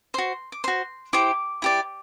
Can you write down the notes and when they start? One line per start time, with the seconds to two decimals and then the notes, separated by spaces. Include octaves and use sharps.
0.14 F#4 C5 C6
0.52 D6
0.64 F#4 C5 C6
1.13 E4 G4 C5 D6
1.62 E4 G4 D5